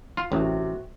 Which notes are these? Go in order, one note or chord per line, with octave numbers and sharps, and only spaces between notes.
F4
A1 C3 F#4